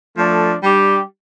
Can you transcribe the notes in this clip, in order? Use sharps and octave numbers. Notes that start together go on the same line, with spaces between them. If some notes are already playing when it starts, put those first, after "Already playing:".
F3 A3 D4 A4
G3 D4 G4